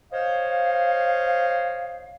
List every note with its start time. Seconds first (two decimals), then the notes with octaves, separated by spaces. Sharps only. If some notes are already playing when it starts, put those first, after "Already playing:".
0.12 C5 C#5 D#5 F5